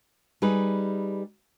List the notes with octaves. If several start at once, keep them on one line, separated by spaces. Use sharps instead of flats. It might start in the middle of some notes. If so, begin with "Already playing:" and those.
G3 D#4 G#4 B4